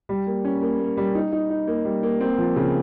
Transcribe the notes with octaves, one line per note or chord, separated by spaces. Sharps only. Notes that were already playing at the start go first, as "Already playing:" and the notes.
G3
A#3
C#4
A#3
A#3
G3
D#4
D#4
D#4
A#3
G3
A#3
C4
F3
C#3